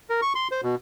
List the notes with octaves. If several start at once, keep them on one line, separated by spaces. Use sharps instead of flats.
A#4
C#6
C6
C5
B2